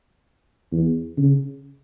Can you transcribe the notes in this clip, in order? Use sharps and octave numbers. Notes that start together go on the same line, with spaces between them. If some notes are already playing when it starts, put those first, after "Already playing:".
E2
C#3